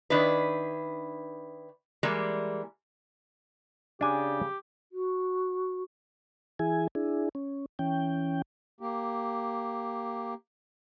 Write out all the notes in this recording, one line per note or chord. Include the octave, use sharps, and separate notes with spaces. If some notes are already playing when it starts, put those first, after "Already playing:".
D#3 D4 E4 B4
E3 G3 G#3 A#3
C#3 D4 G4 G#5
F#4
E3 E4 G#4 G#5
D4 E4 G#4
C#4
E3 C#4 G5
A#3 G4